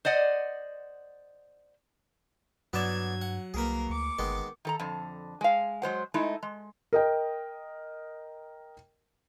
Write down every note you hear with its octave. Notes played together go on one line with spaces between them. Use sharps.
C5 D5 D#5 F#5
G2 F#3 B3 E4 D5 G#6 E7
F#5
C2 A#3 G#4 A#4 B4
D2 C#6 D6
G1 D#3 G#3 B3
D#3 A4 A#5
F2 D3
G#3 F5
F#3 G#3 C5 F#5
G#3 A3 D#4 E4
G#3
A#4 D#5 G5